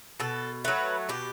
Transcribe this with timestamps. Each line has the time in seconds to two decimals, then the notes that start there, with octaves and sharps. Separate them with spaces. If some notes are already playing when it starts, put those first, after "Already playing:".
0.20 B2 A4
0.64 F#3 A3 B4
1.09 B2 G4